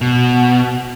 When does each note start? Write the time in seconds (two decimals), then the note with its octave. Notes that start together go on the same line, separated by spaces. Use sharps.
0.01 B2